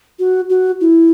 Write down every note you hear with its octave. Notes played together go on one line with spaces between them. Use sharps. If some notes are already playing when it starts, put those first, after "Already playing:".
F#4
F#4
E4